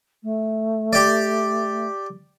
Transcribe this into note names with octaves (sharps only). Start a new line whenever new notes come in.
A3
G4 D5